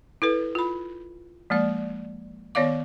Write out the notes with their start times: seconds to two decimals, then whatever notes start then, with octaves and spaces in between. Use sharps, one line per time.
0.22 E4 A4 B4
0.55 F4 B5
1.50 F3 G#3 A#3 D5
2.55 D#3 B3 C#5 D5 F5 D6